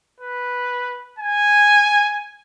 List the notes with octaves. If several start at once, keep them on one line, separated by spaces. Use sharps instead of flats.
B4
G#5